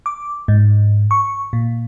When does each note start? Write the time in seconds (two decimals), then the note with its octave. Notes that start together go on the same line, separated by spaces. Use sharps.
0.06 D6
0.48 G#2
1.11 C#6
1.53 A#2